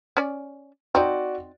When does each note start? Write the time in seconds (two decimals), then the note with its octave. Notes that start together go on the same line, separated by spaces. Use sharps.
0.17 C#4 D5
0.95 C4 D#4 F#4 D5